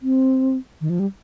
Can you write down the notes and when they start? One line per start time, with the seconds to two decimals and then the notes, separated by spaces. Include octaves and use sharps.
0.02 C4
0.81 D#3
0.90 F3
0.99 G3